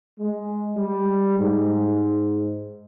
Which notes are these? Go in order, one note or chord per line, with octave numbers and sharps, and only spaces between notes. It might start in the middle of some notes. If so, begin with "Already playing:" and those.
G#3
G3
G#2